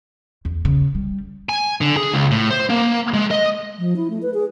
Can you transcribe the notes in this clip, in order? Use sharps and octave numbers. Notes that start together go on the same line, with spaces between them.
E2
C#3
G3
G#5
D3
G#4
C#2
A2
C5
A#3
G#3
D#5
F3
E4
A3
B4
G#4